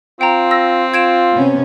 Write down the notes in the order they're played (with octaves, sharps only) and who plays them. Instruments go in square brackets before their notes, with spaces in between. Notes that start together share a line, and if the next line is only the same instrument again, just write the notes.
[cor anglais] C4 [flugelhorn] F4 [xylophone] G5 A#5
[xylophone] E6 A#6
[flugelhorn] F4 [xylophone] G#6 D7 E7
[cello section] C3 B3 C#4